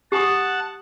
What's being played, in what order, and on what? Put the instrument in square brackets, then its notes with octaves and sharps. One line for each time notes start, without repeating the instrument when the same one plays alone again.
[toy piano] G4 D#6 [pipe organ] F#5 A5